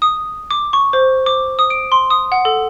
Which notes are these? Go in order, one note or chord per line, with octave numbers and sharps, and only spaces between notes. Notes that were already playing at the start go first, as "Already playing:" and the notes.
D#6
D6
C#6
C5
D6
D#6
D7
C6
D#6
F#5
A4